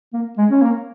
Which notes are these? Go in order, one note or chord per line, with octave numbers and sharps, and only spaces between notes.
A#3
G#3
C#4
A#3